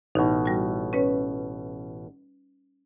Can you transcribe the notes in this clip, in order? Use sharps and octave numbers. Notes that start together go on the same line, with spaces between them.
A1 B2 D#4
G3 F#4
C#4 B4 C#5